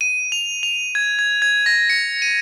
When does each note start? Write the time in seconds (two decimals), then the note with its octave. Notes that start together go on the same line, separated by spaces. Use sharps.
0.01 D#7
0.32 F7
0.63 F7
0.95 G#6
1.19 G#6
1.42 G#6
1.66 A#6
1.90 C#7
2.22 D#7